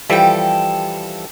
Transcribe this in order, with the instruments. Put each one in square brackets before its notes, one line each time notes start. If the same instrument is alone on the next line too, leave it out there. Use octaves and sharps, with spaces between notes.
[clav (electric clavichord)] E3 F3 G3 [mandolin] A4 G5